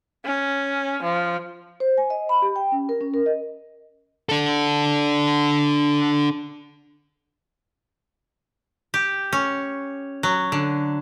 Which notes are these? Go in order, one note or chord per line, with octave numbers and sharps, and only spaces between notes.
C#4
F3
C5
G#5
D#5
B5
G4
G5
C#4
A#4
C#4
A#4
D#5
D4 A4
G4
C#4
F#3
D3